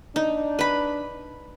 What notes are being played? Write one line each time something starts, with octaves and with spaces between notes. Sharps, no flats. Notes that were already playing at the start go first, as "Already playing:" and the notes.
D4 D#4
B4 B5